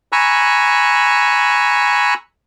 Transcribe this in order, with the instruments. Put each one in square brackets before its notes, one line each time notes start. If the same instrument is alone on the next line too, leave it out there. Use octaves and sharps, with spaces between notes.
[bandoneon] G#5 A#5 B5 C#6 E6 F#6